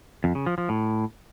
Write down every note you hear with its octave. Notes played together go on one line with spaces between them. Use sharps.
F2
C#3
F3
F3
A2